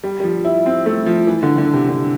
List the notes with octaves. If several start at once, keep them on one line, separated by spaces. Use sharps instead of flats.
G3
G3
F3
E4
C4
A3
F3
E3
D3
D3
C3
D3